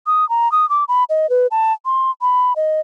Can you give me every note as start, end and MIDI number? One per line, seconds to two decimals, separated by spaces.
0.07 0.28 87
0.29 0.51 82
0.52 0.68 87
0.69 0.84 86
0.88 1.04 83
1.10 1.29 75
1.30 1.47 71
1.51 1.73 81
1.86 2.11 84
2.21 2.53 83
2.56 2.80 75